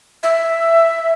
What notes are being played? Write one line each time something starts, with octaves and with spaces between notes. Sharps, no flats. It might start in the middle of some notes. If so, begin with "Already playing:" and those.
E5